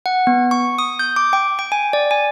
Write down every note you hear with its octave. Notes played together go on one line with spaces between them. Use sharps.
F#5
B3
C#6
D#6
G6
D6
G5
G5
G#5
D5
G#5